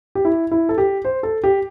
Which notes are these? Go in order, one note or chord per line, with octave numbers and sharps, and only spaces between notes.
G4
E4
E4
A4
G4
C5
A4
G4